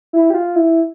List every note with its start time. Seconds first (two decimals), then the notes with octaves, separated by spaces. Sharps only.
0.13 E4
0.30 G4
0.34 F4
0.56 E4